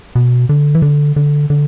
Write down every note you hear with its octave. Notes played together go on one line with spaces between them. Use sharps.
B2
D3
E3
D3
D3
D3